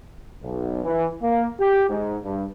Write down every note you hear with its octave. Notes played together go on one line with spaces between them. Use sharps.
B1
E3
A#3
G4
G#2
G2